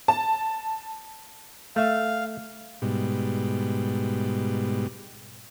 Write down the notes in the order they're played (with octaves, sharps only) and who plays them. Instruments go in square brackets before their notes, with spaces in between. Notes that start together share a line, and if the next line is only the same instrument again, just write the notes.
[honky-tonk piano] A5
[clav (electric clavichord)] A3 E5 [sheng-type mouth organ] F5
[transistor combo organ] G#2 B2 G3